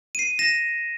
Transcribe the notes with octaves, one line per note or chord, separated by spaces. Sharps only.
C7 D#7
A#6 E7